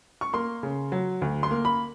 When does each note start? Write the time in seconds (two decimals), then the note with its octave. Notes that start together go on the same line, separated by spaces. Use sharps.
0.21 C#6
0.33 A#3 C6
0.63 C#3
0.92 F#3
1.22 D2
1.43 C6
1.51 A#3
1.65 B5